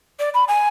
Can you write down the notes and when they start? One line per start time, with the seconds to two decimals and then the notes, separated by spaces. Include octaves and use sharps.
0.20 D5
0.34 B5
0.48 G#5